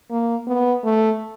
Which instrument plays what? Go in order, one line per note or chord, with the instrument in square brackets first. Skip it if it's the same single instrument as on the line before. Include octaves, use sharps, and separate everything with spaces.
[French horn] A#3
B3
A3